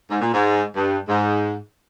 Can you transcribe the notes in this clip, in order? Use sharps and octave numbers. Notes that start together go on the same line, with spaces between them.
G#2
A#2
G#2
G2
G#2